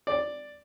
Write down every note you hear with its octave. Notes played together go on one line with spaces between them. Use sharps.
D5